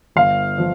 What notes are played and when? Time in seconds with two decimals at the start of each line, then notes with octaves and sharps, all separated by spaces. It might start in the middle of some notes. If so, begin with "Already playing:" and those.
0.16 G1 F5
0.58 F3